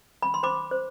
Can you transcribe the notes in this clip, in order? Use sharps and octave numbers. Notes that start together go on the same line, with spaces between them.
B5
C6
C5 B5 D6
C5